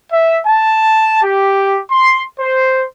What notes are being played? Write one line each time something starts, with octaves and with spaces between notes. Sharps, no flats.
E5
A5
G4
C6
C5